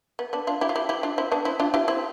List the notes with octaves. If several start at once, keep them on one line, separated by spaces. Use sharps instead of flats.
B3
B3 D4
D4 F4
E4 G4
F4
E4 G4
E4 G4
D4 F4
C4 E4
B3 D4
C4 E4
D4 F4
E4 G4
C4 E4